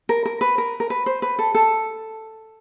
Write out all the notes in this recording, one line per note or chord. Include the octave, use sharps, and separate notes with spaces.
A#4
A#4
B4
A#4
A#4
B4
C5
B4
A4
A4